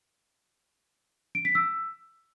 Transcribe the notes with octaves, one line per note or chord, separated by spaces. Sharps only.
D7
B6
E6